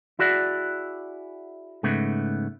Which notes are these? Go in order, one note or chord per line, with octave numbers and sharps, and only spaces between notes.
E4 F#4 G#4 D5 F#5
G#2 C#3 A3 B3